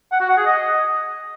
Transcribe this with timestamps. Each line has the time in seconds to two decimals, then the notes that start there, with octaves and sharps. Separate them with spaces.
0.12 F#5
0.21 F#4
0.29 F#5
0.38 G#4
0.46 D#5